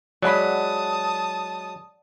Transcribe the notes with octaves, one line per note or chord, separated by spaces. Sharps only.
F#3 G#3 D5 F#5 A5 B5 D#6